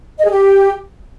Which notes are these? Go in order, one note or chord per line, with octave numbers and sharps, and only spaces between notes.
D#5
G#4
G4